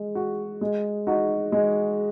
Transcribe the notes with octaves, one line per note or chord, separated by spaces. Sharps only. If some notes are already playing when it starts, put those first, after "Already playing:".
Already playing: G#3
F#4
G#3
D#4 F#4
G#3